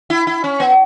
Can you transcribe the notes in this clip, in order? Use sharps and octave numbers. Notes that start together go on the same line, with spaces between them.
E4
E4
C#4
B3